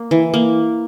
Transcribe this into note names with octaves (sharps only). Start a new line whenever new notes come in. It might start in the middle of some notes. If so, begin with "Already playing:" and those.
Already playing: A#3
E3
A#3